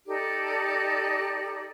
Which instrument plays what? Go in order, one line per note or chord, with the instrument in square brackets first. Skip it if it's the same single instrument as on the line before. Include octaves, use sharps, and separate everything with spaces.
[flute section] D#4 G4 A4 D5